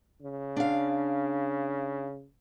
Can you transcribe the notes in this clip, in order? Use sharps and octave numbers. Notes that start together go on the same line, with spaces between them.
C#3
D4 F5